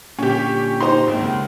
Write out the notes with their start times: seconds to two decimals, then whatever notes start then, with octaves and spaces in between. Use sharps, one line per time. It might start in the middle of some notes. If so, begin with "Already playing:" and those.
0.19 A#2 D3 C#4 G4
0.81 D#4 G4 C5 C6
1.07 G#1 G#2 A#3
1.20 C#2